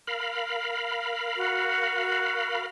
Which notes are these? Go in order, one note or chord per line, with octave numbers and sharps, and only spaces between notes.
A#4 F5 B5
F#4